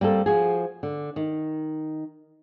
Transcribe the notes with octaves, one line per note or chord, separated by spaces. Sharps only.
G3 A#3 C4 A4
F3 F#4 G#4
D3
D#3